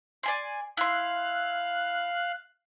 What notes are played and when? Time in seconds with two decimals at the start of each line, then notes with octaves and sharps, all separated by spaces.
0.23 D5 G#5 C6
0.77 E4 F5 C6 F#6